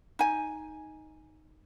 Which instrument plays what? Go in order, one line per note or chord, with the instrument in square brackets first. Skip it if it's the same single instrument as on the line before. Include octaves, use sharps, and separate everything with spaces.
[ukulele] D#4 G#5